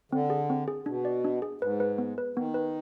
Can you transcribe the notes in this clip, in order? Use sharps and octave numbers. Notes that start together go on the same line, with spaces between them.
D3 C4
G#4
C4
G#4
B2 D4
D5
D4
G#4
G#2 B4
B4
B3
B4
D#3 B3
B4